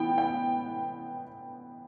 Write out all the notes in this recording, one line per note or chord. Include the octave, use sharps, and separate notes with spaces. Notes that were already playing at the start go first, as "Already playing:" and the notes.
Already playing: A2 E3 B3 G5
G5